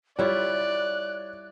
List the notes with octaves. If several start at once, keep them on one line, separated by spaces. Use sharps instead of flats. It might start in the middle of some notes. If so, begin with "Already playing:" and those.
G3 E4 F4 C#5 D5 F#6